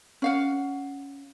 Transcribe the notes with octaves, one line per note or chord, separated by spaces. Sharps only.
C#4 F5 F#5